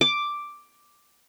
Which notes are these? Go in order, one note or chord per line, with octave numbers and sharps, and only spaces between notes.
D6